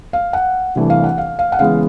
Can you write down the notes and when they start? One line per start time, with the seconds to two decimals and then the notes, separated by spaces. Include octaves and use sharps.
0.13 F5
0.33 F#5
0.75 C2 C3 E3 A3 D4
0.90 F5
1.04 F#5
1.18 F5
1.39 F5
1.52 F#5
1.59 C#3 E3 G#3 B3 F5